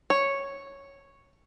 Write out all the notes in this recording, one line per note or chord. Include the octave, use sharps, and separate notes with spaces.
C#5